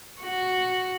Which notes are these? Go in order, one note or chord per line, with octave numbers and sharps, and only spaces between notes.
F#4